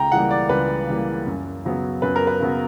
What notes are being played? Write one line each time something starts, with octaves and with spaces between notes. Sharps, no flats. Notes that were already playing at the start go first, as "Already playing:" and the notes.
Already playing: C#2 G5 A#5
C#3 E3 G3 A#3 F#5
D5
C#2 B4
C#3 E3 G3 A#3
F#2
C#3 F#3 B3
F#2 B4
A#4
B4
C#3 F#3 B3